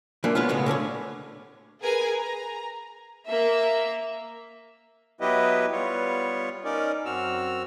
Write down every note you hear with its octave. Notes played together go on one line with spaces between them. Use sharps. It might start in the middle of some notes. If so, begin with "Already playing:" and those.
E3 A#3 D4 F4
G#3 B3 C#4 F4
A2 C#3 G#3 B3
D3 C#4 A#4 C#5
G#4 A#4 B4 G#5
A#5
A#3 E5
F#3 B3 E4 G4 B4 D#5
G3 B3 F4 C#5
C#4 D#4 A#4 D5
F#2 C4 F#4 E6 F6